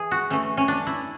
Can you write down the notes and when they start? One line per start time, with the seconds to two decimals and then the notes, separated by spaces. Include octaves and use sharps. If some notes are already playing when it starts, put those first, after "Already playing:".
Already playing: E3 G#4
0.11 F#4
0.30 E3 A3 C#4
0.57 C#4
0.68 D4
0.87 E4